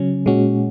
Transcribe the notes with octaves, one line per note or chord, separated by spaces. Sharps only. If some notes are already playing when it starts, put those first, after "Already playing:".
Already playing: C#3 F#3 C#4
A#2 G#3 C#4 F#4